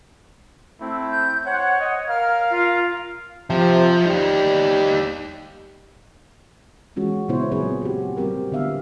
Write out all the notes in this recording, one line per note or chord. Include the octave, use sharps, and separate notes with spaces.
A3 C4 E4
G6
C5 C#5 F#5
D#5
A#4 F5 F6
F4
C3 F3
G3 D#4 G4
E3 G#3 C#4 F#4
A#2 C#3 B3 E4 C5 C#5
F#3 C4 G#4 B4 C#5
F#4 G4
G3 C4 G4 A#4
D3 B3 E5 F5